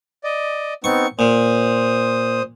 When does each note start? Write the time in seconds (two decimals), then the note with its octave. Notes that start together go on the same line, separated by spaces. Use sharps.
0.24 D5 D#5
0.84 B3 C4 D#4 C#6
1.19 A#2 C5 D#6